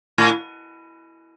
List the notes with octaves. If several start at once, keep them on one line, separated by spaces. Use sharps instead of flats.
A2